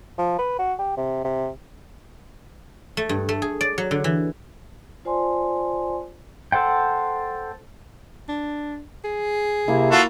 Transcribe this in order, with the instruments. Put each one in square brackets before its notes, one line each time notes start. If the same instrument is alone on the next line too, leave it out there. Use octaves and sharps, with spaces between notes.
[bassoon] F3
B4
F#4
G4
C3
C3
[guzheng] A3
G2
A3
G#4
D5
F#3
D3
E3
[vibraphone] F4 C5 D5 G#5 A5 C6
[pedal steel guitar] A4 C5 F#5 G5
[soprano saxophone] D4
G#4
[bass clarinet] C3 [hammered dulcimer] A#3 E4
[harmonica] F4 F#4 A4 [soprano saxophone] E5